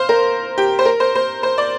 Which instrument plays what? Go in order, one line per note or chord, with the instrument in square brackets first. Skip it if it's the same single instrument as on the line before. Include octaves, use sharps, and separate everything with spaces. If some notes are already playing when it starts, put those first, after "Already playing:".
Already playing: [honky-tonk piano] C5 F5
A#4
G4
C5
A#4
C5
C5
C5
D5